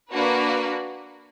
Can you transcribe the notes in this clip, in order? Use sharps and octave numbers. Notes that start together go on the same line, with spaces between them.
A#3 D4 F#4 B4